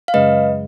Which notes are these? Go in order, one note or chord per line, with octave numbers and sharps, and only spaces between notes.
F5
F#2 C#3 G#3 B4 D#5